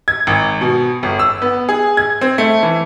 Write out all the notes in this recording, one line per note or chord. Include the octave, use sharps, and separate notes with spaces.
G#6
G#1
B2
G1
E6
B3
G#4
G#6
C4
A3
E3